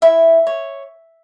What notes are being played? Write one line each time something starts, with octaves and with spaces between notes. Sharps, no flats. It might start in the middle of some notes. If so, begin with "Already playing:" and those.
E4 E5
C#5